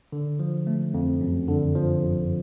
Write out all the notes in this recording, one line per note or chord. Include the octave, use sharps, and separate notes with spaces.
D3
F3
A3
F2
F#2
D3
F3
G1